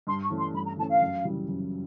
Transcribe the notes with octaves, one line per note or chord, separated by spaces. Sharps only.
G2 C6
C#6
E3 A3 C#4
C6
G2 B5
A#5
E3 A3 C#4 A5
F5
F#2
C#3 E3 G3
F#2